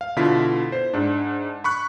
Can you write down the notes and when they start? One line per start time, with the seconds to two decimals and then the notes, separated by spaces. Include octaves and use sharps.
0.01 F5
0.16 B2 D3 E4 F4 B6
0.72 C5
0.94 G#2 D4
1.64 B5 C#6 F#6